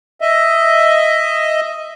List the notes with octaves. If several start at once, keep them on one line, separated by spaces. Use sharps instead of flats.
D#5 E5